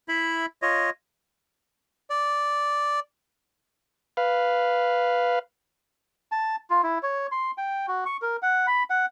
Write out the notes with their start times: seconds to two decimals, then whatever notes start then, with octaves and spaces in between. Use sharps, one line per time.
0.08 E4 E5 B5
0.62 F4 C#5 D#5
2.10 D5
4.17 B4 F5
6.32 A5
6.70 F4
6.83 E4
7.03 C#5
7.32 C6
7.58 G5
7.88 F#4
8.06 C#6
8.22 A#4
8.42 F#5
8.67 B5
8.90 F#5